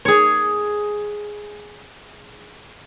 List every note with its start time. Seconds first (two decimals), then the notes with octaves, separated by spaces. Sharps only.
0.05 G#4 C#5